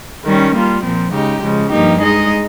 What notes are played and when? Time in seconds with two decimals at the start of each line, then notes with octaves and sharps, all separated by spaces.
0.25 D#3 G3 C#4
0.54 G3 A#3 F4
0.83 A#2 F3 C4
1.12 C#3 G#3 D#4 G4
1.42 C#3 F3 G#3
1.70 G2 F3 A#3 D#4 G4
2.00 G#3 D#4 G#4 D#5